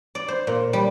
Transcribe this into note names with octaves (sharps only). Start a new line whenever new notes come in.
D5
C5
A#2
G3